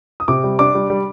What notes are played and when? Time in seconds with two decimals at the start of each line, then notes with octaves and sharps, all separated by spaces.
0.20 D#6
0.28 C3 D6
0.44 G3
0.59 D4 D6
0.75 G3
0.90 G3